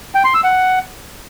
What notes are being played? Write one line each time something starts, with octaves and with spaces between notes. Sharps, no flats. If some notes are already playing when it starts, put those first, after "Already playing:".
G5
C6
E6
F#5